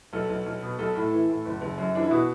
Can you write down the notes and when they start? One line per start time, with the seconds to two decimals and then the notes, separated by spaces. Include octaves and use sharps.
0.13 B1 A4
0.29 B1
0.46 B1
0.62 B2
0.79 B1 A4
0.95 A2
1.12 E3
1.29 A2
1.45 F#1
1.61 F#1
1.77 F#2
1.95 E3 D4
2.03 E4
2.11 B2 F#4